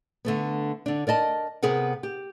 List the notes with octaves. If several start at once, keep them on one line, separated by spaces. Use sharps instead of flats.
D3 A3 B3
D3 D4
A#4 D5 D#5 A5
C3 B3 G#4 A#4 F#5
G4